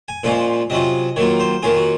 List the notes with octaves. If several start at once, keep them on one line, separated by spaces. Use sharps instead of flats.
G#5
A#2 F3 G#3 C#4 F4 F5
C3 F#3 C#4 F4 D#5
D#3 F#3 A#3 F4 C#5
C5
D#3 A#3 C#4 F4 G#4
F#4